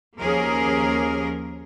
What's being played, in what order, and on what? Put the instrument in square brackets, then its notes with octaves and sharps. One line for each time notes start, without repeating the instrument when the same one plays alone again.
[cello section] D#2 F3 A#3 C#4 G#4 A#4